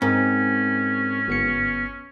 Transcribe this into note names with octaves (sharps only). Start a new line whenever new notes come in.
G#2 C4 C#4 A#4
G1 B3 C#7